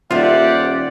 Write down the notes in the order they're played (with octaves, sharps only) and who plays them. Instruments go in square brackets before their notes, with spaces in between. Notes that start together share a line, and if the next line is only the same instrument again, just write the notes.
[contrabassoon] D#1 [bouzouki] C4 E5 [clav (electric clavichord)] F4 [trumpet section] G4 D5 F#5